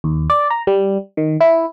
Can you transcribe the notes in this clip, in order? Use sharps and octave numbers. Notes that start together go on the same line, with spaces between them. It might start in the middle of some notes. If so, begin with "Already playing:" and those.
D#2
D5
A#5
G3
D#3
E4